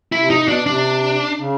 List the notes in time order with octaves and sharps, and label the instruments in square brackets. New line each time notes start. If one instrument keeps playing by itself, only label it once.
[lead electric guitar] E4
[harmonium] C3
[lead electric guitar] D#4
[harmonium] B2
[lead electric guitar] D4
[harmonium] C3 [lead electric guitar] D4
[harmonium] C#3